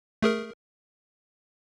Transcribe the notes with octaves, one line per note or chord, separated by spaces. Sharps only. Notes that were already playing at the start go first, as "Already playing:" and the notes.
A3 G#4 A#4